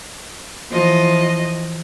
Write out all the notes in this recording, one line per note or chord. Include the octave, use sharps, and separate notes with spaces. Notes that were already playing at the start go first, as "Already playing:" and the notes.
E3 F3 D#5